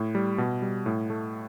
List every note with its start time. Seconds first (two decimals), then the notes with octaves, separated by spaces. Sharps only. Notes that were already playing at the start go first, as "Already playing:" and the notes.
Already playing: A2
0.15 G3
0.38 B2
0.62 G3
0.86 A2
1.10 A3